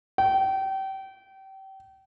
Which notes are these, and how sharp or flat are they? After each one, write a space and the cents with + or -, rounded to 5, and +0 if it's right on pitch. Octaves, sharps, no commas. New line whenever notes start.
G5 -30